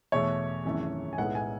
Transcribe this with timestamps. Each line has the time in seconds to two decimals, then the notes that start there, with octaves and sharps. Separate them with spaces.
0.12 E2 B2 A3 C#5
0.65 G#1 F#2 E3 A3
1.13 G#5
1.18 B1 A2 G#3 B3 F#5
1.35 G#5